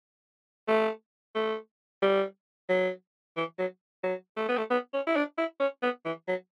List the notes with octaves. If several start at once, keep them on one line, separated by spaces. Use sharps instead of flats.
A3
A3
G3
F#3
E3
F#3
F#3
A3
B3
A3
B3
C#4
E4
D4
E4
C#4
B3
E3
F#3